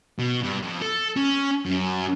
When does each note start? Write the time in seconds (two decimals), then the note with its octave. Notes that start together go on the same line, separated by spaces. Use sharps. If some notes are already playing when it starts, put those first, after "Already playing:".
0.19 B2
0.43 G2
0.62 F2
0.81 A4
1.16 C#4
1.66 F#2